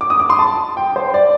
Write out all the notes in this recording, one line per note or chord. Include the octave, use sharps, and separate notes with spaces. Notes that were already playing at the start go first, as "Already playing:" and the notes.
D6
D#6
D6
C6
A5
G5
C5
D5